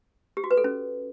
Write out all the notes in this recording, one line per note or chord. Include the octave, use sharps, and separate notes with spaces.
G4
F#4
B4
A4
C#4